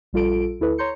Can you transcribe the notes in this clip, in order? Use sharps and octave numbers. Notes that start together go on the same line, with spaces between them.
A#1 G3 F4 A4 D7
D2 E4 A4 B4
C#5 A#5 C6 G6 C#7